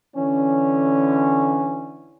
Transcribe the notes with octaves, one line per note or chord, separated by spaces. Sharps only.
D3 E3 C#4